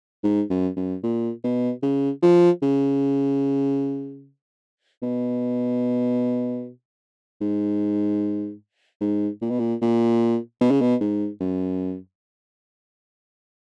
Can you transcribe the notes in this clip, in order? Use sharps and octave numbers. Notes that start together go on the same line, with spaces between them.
G#2
F#2
F#2
A#2
B2
C#3
F3
C#3
B2
G#2
G#2
A#2
B2
A#2
A#2
B2
C#3
B2
G#2
F#2